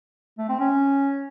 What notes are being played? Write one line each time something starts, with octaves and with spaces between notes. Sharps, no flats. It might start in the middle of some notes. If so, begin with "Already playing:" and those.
A3
C4
C#4